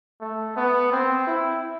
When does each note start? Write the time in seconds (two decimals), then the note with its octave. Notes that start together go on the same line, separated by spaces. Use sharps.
0.21 A3
0.57 B3
0.92 C4
1.27 E4